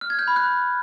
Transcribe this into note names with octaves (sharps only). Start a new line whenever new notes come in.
F6
G#6
G6
B5
F#6